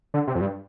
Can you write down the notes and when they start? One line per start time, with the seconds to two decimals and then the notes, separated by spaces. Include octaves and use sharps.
0.14 D3
0.27 C3
0.35 F2
0.41 G2